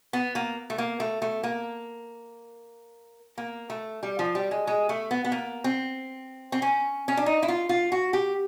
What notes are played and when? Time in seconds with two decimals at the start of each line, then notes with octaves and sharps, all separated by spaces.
0.13 B3
0.35 A#3
0.70 A3
0.78 A#3
1.00 A3
1.22 A3
1.43 A#3
3.38 A#3
3.70 A3
4.03 G3
4.19 F3
4.35 G3
4.51 G#3
4.67 G#3
4.89 A3
5.11 B3
5.25 B3
5.32 A#3
5.64 C4
6.52 C4
6.62 C#4
7.08 C#4
7.17 D4
7.26 D#4
7.42 E4
7.48 F4
7.69 F4
7.92 F#4
8.13 G4